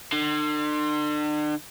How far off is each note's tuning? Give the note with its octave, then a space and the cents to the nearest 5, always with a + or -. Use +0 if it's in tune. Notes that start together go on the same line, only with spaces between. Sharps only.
D3 +40